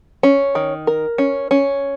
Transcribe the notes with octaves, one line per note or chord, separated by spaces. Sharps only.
C#4
D#3
A#4
C#4
C#4